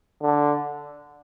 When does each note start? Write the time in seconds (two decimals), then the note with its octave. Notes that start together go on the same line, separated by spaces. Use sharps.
0.22 D3